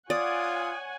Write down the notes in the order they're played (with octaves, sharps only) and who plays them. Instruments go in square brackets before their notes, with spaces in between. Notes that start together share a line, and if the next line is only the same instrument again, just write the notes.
[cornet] F4 [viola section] C#5 F#5 G#5 [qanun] D5 [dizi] D#6